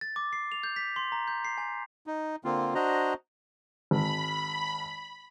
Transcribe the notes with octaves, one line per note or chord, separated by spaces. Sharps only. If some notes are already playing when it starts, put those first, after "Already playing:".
A6
D6
C7
F7
G6
B6
C6
A#5
G6
C7
G#5
D#4
D3 A#3 C4 F4
D4 F#4 C5 D#5 A#5
G#1 B5